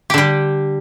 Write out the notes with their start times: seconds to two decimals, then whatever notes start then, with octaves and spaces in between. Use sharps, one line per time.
0.10 G4
0.14 D3
0.18 G3